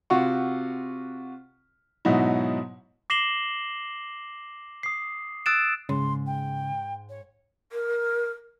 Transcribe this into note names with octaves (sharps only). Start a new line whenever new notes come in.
C3 F4 F#4 F#5 C#6
G#2 B2 F#3 D#4 E4
D6 A#6 C7 E7 F#7 G7
D#6 C7
D#6 E6 F#6 A6 D7 E7
G#2 C#3 C6
G5
C#5
A#4